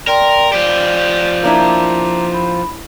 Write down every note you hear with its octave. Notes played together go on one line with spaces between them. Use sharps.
A#4 D5 G5 C6
F3 G4 D5
A#3 D4 E4 A#5 D6
B5